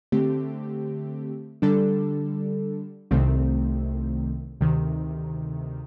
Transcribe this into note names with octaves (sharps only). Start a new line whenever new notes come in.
D3 A3 C4 G4
D3 G3 D4 A4
C2 C3 D#3 A3 C4
D2 C3 D#3